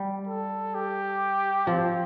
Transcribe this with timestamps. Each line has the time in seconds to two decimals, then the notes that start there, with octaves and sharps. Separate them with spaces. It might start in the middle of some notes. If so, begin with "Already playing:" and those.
Already playing: G3
0.27 A4
0.75 G4
1.67 F3 C4